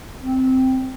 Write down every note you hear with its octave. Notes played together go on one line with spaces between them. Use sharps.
C4